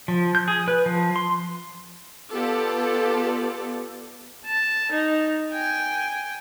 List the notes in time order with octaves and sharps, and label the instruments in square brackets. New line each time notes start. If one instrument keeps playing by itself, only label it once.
[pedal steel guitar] F3
G6
G#4
B4
F3
C6
[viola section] B3 F4 G4 A4 D5
[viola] A5
D#4
G5 G#5